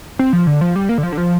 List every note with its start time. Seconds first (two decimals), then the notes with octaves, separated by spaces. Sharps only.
0.19 C4
0.33 F3
0.47 D3
0.61 F3
0.76 G3
0.89 A#3
0.98 D3
1.03 F3
1.12 D3
1.18 F3